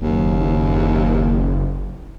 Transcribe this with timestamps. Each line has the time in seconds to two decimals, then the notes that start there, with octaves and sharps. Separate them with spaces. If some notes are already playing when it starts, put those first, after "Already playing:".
0.01 F#1 D#2